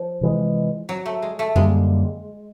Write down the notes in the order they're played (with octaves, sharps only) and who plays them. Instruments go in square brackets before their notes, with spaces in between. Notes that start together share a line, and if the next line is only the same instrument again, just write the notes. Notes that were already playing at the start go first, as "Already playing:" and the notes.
Already playing: [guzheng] F3
[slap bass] C3 E3 G#3
[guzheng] F#3
A3
G#3
A3
[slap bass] F#2 D3 G3 A#3 [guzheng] G#3